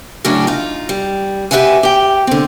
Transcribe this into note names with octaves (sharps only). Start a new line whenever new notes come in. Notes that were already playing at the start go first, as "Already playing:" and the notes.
F#2 A2 C#3 F#3 C#4 D4
D#4 F4
G3
G4 G#4 B4 E5 F#5 G#5
G4 G5
D3 C4